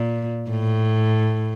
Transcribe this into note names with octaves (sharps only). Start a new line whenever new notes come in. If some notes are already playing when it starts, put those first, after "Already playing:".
Already playing: A#2
A2